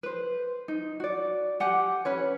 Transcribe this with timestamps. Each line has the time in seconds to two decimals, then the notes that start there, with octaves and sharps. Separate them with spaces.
0.03 B4 C5
0.68 D#4
1.00 F#4 D5
1.60 G4 F#5 G#5
2.05 C#4 B4 C#5